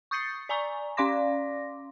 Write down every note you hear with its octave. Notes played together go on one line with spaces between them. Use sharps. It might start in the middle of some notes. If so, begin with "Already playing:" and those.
C#6 D#6 G6 A6 C7 C#7
D5 G#5 A#5 C#6
C#4 D5 F5 C6 D6 A#6